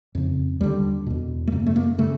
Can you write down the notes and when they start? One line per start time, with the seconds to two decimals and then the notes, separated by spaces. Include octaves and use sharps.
0.15 F2 C#3
0.61 D#2 D3 G3
1.07 E2 B2
1.47 A3
1.52 F#2 C#3 A#3
1.66 A3
1.76 A#3
1.98 C#3 A3